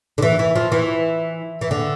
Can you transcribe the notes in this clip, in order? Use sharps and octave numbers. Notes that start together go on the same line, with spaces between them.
D3
E3
E3
F3
E3
E3
D3